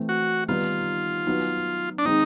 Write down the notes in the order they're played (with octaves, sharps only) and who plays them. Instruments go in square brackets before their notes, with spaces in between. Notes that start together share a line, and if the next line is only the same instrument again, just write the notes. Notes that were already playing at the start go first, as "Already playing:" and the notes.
Already playing: [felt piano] E3 A3 C4
[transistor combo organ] F#4
[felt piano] D#3 G3 B3 D#4 [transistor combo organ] F4
[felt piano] F#3 B3 D#4
[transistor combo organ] D4
[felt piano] D#3 G#3 C4 [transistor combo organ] D#4